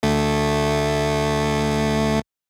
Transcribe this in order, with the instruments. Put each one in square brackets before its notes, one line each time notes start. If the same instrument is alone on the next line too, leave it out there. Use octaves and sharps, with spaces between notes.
[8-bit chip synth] D2 A3